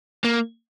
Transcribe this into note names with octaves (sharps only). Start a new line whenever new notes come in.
A#3